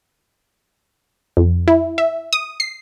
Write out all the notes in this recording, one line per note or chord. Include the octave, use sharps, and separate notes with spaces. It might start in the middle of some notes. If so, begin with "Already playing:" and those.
F2
E4
E5
D#6
C7